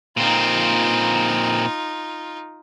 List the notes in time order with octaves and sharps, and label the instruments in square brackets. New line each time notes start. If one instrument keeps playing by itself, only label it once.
[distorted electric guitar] A#2 C4 [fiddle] D#4 F4